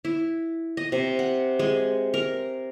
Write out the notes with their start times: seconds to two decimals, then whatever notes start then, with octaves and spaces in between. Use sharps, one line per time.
0.05 E4
0.77 D#5
0.92 C3
1.19 F#5
1.59 G#3
2.14 A#4